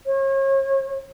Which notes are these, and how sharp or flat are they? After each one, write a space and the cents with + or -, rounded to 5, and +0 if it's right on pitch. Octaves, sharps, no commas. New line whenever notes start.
C#5 -35